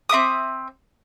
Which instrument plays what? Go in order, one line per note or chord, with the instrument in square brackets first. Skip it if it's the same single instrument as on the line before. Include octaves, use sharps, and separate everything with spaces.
[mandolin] C4 E5 D6 D#6